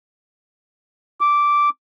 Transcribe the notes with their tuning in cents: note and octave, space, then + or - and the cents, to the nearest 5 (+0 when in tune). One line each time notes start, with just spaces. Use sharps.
D6 -5